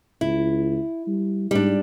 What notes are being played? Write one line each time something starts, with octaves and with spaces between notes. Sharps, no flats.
C#2 E4
G3
G#2 G3 D4